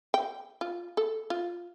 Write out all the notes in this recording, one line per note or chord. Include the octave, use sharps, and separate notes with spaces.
G5
F4
A4
F4